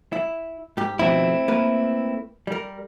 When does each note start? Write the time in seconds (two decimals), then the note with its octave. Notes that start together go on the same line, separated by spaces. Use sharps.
0.13 E4
0.77 G#2 G4
0.99 F2 B2 D#3 A3 C4 E4
1.48 A#3 A#4 B4
2.47 G3 A#4